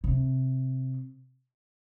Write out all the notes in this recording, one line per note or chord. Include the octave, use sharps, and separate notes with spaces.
C3